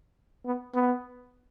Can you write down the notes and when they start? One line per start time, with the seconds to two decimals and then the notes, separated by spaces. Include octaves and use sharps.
0.45 B3
0.74 B3